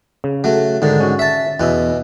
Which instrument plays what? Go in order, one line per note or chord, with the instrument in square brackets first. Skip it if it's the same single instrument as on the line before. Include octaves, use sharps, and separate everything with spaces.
[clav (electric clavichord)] C#3
[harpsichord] F#3 A3
[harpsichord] G#2 D3 [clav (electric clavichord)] D#3
[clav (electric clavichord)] C#4 F#4
[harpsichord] E5 A5
[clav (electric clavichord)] E2 E5 [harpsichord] B2 C#4